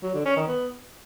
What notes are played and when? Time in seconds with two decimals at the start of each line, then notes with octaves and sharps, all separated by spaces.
0.03 F#3
0.14 D3
0.25 C#4
0.37 D#3
0.48 B3